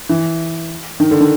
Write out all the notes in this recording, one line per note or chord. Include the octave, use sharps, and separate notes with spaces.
E3
D#3
D3
D#3